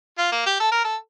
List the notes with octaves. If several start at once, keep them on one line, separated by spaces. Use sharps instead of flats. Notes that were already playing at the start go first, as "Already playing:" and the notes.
F4
A#3
G4
A4
A#4
A4